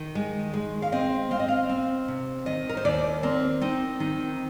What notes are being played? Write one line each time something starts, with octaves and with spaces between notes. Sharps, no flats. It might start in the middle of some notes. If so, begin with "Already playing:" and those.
Already playing: D#3
G#3
G#3
F5
C4 D#5
C4 F5
D#5
F5
C4
C3
D#3 D#5
A#4
C5
D#2 D5
C4 A#4
C4 D#4
D#3 D#4